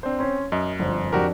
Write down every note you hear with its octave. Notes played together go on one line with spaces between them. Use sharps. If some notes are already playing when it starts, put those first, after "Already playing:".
C4 D4 C5
C#4 C6
F#2 D#5
G1 F2 C5
F2 D4 F#4 G4 A#4